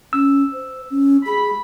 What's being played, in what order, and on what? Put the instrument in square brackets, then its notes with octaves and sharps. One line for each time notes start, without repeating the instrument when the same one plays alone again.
[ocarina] C#4 [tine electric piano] E6
[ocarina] C5
C#4
[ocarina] G#4 [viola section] B5